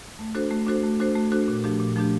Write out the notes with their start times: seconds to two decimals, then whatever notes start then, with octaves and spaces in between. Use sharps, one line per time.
0.19 A3
0.35 D4 F#4 A4 C5
0.51 A3
0.67 D4 F#4 A4 C5
0.84 A3
1.00 D4 F#4 A4 C5
1.15 A3
1.32 D4 F#4 A4 C5
1.48 A#2
1.64 F3 A3 D4 G4
1.80 A#2
1.96 F3 A3 D4 G4